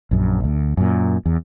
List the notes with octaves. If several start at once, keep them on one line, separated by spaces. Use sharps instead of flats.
A#1 F#2
D2
F#2 A#2
E2